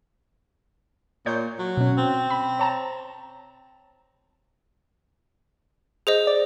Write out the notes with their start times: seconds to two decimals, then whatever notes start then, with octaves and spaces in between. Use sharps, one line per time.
1.26 A#2 C#5 D5 G6
1.59 F#3
1.77 B2 C#4
1.98 C4
2.30 B5
2.59 C#5 A5 A#5
6.07 G#4 C5 D#5
6.27 D5